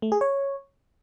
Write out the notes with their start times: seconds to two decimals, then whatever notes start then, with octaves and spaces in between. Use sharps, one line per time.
0.02 A3
0.12 G#4
0.21 C#5